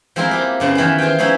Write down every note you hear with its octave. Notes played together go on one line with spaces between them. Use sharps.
F3 G#3 C4 E4 F4 A#4
G3 A#3 G4
F#2 C#3 B3 F5
D#3 E3 B3 C#4
F4 G#4 C5 F5 G5
F3 B3 C#4 D#4 E4